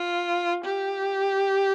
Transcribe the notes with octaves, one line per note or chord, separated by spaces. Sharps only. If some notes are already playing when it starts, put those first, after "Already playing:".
Already playing: F4
G4